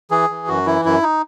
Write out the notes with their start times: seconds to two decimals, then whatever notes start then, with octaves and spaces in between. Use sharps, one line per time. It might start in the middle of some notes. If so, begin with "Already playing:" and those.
0.11 E3 G#4
0.30 E3
0.47 F#2 F#4
0.66 E3 E4
0.85 F#2 E4
1.03 D#4